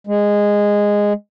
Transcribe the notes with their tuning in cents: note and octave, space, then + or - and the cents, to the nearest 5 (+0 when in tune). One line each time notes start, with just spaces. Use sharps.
G#3 -10